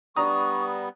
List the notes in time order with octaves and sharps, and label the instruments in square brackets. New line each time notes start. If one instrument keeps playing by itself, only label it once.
[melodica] G3 B3 [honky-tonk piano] D4 A#5 D#6 [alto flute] C#6